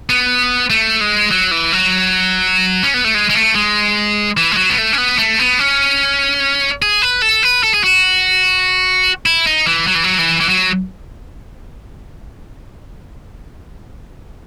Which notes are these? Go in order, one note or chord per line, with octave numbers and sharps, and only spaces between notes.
B3
A3
G#3
F#3
E3
F#3
C#4
B3
A3
G#3
G#3
A3
G#3
E3
G#3
F#3
B3
A3
C#4
B3
A3
B3
C#4
G#4
B4
A4
B4
A4
G#4
F#4
E4
D#4
E3
F#3
E3
F#3
E3
E3
F#3